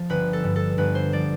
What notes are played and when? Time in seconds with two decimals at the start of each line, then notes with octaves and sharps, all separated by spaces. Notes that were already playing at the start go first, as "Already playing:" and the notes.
Already playing: F3
0.09 G1 B4
0.33 A4
0.44 G2
0.56 A4
0.78 G1 B4
0.95 C5
1.13 F3 D5